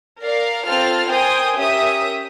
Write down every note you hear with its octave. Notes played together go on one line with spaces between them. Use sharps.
A#4 D5 F5
C4 F4 A4 F6 A6
A#4 C5 G5 G#5 D#6
C#4 G4 A#4 E5 D#6